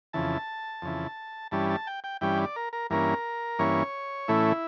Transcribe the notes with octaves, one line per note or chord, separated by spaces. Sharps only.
F2 C#3 E3 A5
F2 C#3 E3
G2 E3 G3 C#4 A5
A5
G5
G5
G2 E3 G3 C#4 G5
D5
A#4
A#4
G2 E3 A#3 C#4 A#4
G2 E3 A#3 C#4 C#5
A2 E3 A3 C#4 E4